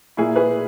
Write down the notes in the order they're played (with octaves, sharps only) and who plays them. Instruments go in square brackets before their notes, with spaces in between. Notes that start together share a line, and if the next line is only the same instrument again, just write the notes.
[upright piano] A#2 A#3 E4 G#4
G#4 B4